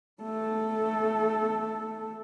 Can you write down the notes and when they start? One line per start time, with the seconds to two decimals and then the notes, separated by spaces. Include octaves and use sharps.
0.22 A3 A4